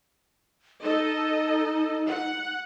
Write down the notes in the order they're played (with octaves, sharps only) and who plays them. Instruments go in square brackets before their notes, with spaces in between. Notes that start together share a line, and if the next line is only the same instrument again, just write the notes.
[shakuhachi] D#4 [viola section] A4 D#5
[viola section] F#5